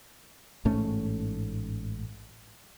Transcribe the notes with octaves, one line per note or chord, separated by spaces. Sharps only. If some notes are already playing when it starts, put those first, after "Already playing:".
A1 G#2 A3 C#4